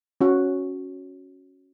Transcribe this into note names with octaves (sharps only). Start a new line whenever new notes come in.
C#4 F#4